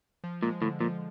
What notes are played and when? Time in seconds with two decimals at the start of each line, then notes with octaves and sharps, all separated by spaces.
0.24 F3
0.43 A#2 G#3
0.61 A2 D3
0.81 A#2 F3